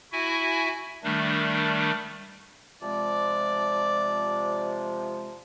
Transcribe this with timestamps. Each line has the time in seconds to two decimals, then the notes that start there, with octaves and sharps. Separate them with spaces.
0.12 E4 F#4 E5 G#5
1.03 D#3 G3 A3 D4
2.82 C3 F3 G#3 D5